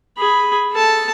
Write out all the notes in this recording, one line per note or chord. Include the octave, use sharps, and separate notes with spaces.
G#4 B5
A4 A5